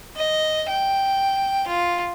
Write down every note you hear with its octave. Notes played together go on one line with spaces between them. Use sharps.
D#5
G5
F4